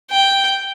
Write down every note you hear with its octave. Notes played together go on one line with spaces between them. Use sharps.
G5